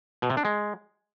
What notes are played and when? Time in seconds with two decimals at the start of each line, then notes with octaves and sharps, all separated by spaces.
0.22 B2
0.30 C3
0.37 D4
0.45 G#3